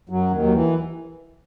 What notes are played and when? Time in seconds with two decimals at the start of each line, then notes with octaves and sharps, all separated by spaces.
0.09 F#2 F#3
0.30 D#2 D#3
0.42 F#3
0.52 E3